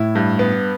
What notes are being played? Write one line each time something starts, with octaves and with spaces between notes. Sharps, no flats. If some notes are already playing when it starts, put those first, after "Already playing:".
Already playing: A2 E4
G2
B3